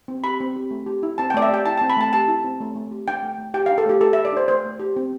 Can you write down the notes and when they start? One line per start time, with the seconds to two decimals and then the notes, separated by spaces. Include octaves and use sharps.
0.08 C4
0.24 G4 B5
0.41 C4
0.56 G4
0.71 A3
0.86 G4
1.03 E4
1.18 C4 A5
1.30 G5
1.34 A3 D5
1.42 E5
1.50 G4 G5
1.66 E4 A5
1.78 A5
1.81 C4
1.90 B5
1.97 A3 A5
2.13 G4 A5
2.28 E4
2.44 C4
2.61 A3
2.75 A3
2.91 G4
3.08 D4 G5
3.23 A3
3.38 A3
3.54 G4 G5
3.66 F5
3.71 D4
3.78 A4
3.86 A3 G4
4.01 A3 A4
4.13 E5
4.17 G4
4.25 D5
4.32 D4 C5
4.48 A3 C5
4.65 A3
4.80 G4
4.96 C4